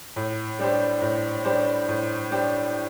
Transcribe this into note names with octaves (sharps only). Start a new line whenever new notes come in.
A2
G3 D4 G4 C5
A2
G3 D4 G4 C5
A2
G3 D4 G4 C5